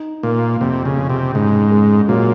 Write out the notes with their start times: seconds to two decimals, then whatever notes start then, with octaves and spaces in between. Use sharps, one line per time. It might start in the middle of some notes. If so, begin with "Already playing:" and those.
Already playing: D#4
0.23 A#2 A#3
0.61 F2 C3
0.85 C#3
0.97 F2
1.09 C3
1.34 G#2 C#3
1.71 G#3
2.09 A#2 F#3